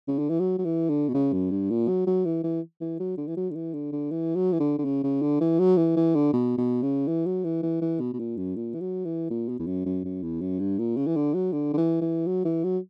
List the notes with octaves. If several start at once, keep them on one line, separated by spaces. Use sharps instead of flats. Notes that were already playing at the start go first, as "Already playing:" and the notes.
C#3
D3
E3
F#3
F#3
E3
D3
B2
C#3
F#2
G2
A#2
F#3
F#3
E3
E3
E3
F#3
D3
E3
F#3
D3
E3
D3
D3
E3
F#3
E3
D3
D3
C#3
C#3
D3
E3
F#3
E3
E3
D3
B2
B2
C#3
E3
F#3
E3
E3
E3
B2
B2
A#2
F#2
A#2
E3
F#3
E3
A#2
B2
E2
F#2
F#2
F#2
E2
F#2
G2
A#2
C#3
E3
D3
F#3
D3
D3
E3
E3
F#3
E3
F#3